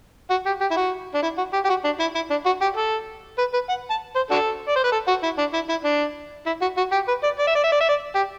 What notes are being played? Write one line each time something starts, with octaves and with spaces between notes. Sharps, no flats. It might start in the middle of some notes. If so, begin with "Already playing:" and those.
F#4
G4
G4
E4
F#4
D4
E4
F#4
G4
G4
F#4
D4
E4
E4
D4
F#4
G4
A4
B4
B4
F#5
A5
C5
D4 F#4 A4
D5
C5
B4
A4
F#4
E4
D4
E4
E4
D4
E4
F#4
F#4
G4
B4
D5
D5
E5
D5
E5
D5
E5
D5
G4